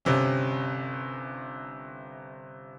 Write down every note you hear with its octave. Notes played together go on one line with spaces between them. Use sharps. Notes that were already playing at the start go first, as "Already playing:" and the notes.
G1 C3 C#4